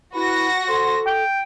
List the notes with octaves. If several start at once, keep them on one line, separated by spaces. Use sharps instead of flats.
E4 F#4 B4 A#6
A4 C5
G5